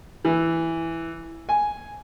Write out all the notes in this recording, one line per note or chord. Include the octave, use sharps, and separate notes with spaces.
E3
G#5